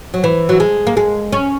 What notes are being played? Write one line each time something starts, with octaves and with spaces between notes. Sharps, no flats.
F#3
E3
F#3
G#3
A#3
G#3
C#4